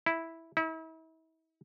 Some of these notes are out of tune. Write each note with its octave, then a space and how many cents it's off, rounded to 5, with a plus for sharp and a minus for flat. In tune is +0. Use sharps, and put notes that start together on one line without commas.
E4 -5
E4 -40